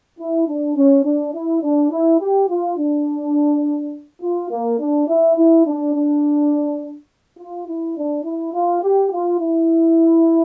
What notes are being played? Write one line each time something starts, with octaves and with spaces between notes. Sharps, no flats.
E4
D4
C#4
D4
E4
D4
E4
G4
F4
D4
F4
A#3
D4
E4
E4
D4
D4
F4
E4
D4
E4
F4
G4
F4
E4